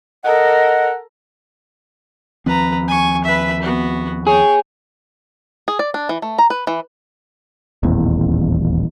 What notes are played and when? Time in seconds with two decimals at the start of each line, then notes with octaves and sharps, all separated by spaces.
0.24 A4 A#4 D#5 F#5
2.46 D#2 F3 C4 B4 A#5
2.88 G#5 C#6
3.25 B4 E5
3.62 B3 F#4
4.27 G#4 C#5 G5
5.68 G#4
5.79 D5
5.94 D4
6.09 E3
6.22 A3
6.38 A#5
6.50 B4
6.67 E3
7.83 D#1 A1 E2